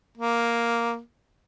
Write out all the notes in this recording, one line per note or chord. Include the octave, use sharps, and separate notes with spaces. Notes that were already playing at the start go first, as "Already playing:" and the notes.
A#3